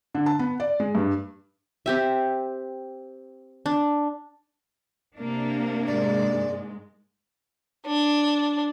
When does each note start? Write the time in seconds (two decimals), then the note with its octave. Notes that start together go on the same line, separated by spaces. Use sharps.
0.15 D3
0.26 A5
0.39 B3
0.60 D5
0.80 G#3
0.95 G2
1.86 C4 G4 E5
3.66 D4
5.17 C3 A#3 D4
5.87 G#2 G#3 D5
7.86 D4